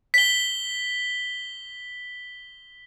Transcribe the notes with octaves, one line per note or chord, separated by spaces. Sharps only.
B6 G7